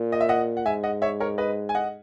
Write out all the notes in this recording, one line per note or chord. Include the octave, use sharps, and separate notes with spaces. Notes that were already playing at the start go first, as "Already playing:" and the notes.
Already playing: A#2
D#5
E5
D#5 F#5
F#5
G#2 E5 G#5
D#5 F#5
C#5 E5
A#4 C#5
B4 D#5
G#5
D#5 F#5